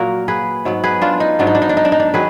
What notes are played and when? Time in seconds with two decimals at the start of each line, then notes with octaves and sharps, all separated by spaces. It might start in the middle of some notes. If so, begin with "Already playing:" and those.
Already playing: A#2 F#3 A#3 F#4 A#4
0.28 G#4 B4
0.65 G#2 F#3 B3
0.84 G#4 B4
1.02 D4 F4
1.20 D#4
1.39 G#2 F#3 B3 D4
1.47 D#4
1.55 D4
1.62 D#4
1.69 D4
1.77 D#4
1.85 D4
1.92 D#4
2.00 D4
2.13 D#3 F#3 G#4 B4